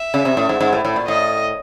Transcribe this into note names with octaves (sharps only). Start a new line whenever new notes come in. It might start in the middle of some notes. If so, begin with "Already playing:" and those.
Already playing: E5
C#3
C3
A2
G#2
G#2
A2
A2
A#2
A2 D#5